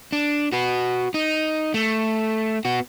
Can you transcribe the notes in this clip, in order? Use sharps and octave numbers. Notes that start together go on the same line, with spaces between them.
D4
F#4 B4
D#4
A3
B3 F#4